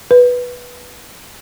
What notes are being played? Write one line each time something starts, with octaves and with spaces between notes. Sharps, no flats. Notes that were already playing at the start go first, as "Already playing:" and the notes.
B4